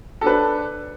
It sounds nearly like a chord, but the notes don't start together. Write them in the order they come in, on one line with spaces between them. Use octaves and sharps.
A4 D4 B4